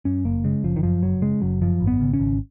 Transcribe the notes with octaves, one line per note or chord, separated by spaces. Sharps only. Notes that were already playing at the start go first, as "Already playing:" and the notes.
F#2 C#4
F#1 A#3
C#3 G#3
F#1 F3
D#3
F#2 F3
F#1 F#3
C#3 G#3
F#1 F#3
F#2 F3
G#1
B3
C#3
C#4
G#1